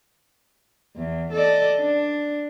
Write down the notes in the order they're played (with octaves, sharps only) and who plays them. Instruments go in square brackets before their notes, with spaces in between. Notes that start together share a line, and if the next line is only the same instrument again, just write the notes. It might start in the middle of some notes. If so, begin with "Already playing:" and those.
[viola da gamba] E2
A4 D5 D#5
D4